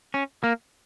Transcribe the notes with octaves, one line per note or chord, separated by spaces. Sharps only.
C#4
A#3